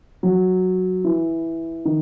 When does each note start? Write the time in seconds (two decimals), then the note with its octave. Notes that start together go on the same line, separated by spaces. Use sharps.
0.23 F#3
1.05 E3
1.85 D#3